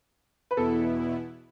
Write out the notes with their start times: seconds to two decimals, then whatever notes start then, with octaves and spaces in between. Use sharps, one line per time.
0.51 B4
0.57 E2 B2 B3 E4 A4